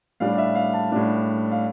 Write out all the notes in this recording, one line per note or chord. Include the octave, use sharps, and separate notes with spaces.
A2 G3 D4 F5
E5
F5
A5
A2 G3 D4
F5